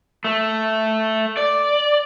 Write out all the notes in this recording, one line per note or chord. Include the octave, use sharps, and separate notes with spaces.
A3
D5